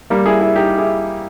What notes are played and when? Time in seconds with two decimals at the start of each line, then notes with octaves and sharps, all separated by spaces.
0.10 G3 A#3
0.26 E4 G#4
0.41 E4 G#4
0.56 D#4 G4
0.78 E4 G#4